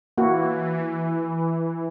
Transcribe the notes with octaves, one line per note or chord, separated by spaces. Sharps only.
E3 A#3 E4 F#4